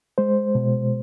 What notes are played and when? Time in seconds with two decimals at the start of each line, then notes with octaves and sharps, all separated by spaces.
0.18 G#3 C5
0.55 B2